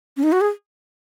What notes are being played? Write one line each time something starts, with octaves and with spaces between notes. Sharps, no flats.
C#4
D#4
F#4
G#4